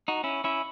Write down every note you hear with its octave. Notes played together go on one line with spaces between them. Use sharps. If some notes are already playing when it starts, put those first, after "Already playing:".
D#4 F#4
C#4 E4
C#4 E4